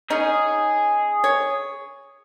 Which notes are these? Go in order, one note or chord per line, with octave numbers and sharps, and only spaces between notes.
C#4 D#4 G#4
C#5